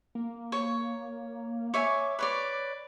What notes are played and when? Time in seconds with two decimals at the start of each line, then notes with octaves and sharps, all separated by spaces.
0.15 A#3
0.52 C#5
1.74 C#5 E5 G#5 D6
2.19 B4 C#5 D5